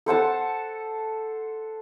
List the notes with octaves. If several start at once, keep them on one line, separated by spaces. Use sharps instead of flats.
A4 C5 F#5 A5